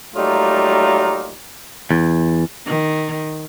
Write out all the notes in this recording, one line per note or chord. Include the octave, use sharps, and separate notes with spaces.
F#3 G3 A3 A#3 D#4 F4
E2
D#3